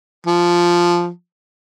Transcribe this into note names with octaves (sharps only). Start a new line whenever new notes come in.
F3